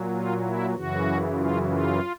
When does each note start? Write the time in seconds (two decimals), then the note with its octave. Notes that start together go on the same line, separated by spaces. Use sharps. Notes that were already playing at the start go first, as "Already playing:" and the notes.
Already playing: A#2 F#3
0.12 F4
0.44 E4
0.74 F#2 C#3 E3 F#4
1.37 F4
1.69 F4